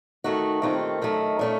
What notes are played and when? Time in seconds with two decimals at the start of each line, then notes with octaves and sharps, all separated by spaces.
0.24 D#3 A3 D#4 F#4
0.62 D#2 D#3 A3 C4 F4
1.02 F#2 D#3 A3
1.39 A#2 A3 C#4